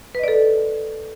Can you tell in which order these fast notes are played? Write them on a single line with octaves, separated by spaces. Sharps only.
B4 D#5 D5 A4